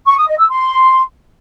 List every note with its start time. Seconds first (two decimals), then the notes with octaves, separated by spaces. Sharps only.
0.07 C#6
0.17 D#6
0.28 D#5
0.39 E6
0.49 C6